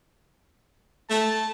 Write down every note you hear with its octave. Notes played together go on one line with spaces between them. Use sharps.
A3 A5